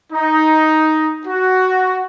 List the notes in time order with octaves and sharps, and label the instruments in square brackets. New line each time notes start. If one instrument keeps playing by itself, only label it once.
[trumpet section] D#4
F#4